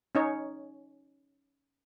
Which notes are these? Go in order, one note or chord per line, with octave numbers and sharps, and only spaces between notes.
C#4 D#4 C#5